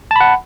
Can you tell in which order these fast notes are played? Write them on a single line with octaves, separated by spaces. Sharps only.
A5 B5 F#5